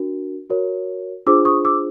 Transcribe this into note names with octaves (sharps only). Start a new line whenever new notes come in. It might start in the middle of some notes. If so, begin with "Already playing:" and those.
Already playing: D4 F#4 A#4
F#4 A#4 C#5
D4 F4 G#4 C5 D6 E6
C#6 D#6
D6 E6